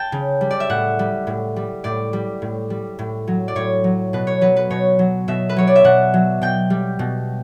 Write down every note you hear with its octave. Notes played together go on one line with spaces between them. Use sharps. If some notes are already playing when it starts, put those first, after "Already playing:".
Already playing: G5 A5
C#3
G3
D5
E5
A2 F#5
G3
A2
G3
A2 D5
G3
A2
G3
A2
F#3
D5
A2 C#5
F#3
B2 B4
C#5
F#3 B4
B4
B2 C#5
F#3
B2 E5
B4
F#3 C#5
D5
E5
B2 F#5
F#3
B2 G5
G3
B2